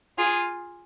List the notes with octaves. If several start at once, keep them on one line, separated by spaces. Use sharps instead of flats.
F4 G#4